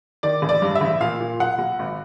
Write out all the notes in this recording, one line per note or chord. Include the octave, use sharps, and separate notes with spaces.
D#3 D5
A1
D5
G2
E5
A1
A#2 F5
A#2
B1 F#5
B1
G#1